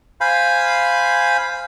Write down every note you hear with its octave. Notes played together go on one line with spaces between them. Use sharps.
C5 F5 G#5 B5